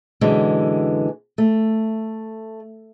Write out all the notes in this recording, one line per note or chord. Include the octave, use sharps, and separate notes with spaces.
F#2 B2 D3 E3 G#3
A3